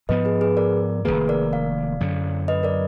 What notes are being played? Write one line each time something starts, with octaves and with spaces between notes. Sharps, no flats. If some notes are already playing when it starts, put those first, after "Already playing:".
G#2 F3 B3 B4 D#5
G#4 B4
G#4 B4
A#4 D5
F1 F2 D#3 A#3 G#4 B4
A#4 D5
D5 F5
F#2 D3 F#3
B4 D#5
A#4 D5